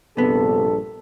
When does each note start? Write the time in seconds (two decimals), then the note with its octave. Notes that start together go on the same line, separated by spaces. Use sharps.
0.17 A#1 G2 C3 B3 A4